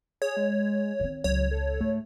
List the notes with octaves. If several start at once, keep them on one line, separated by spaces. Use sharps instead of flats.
G#4 C#5
G#3
D#3 C4
C#2 F#3 C#5
A4
G#2 A3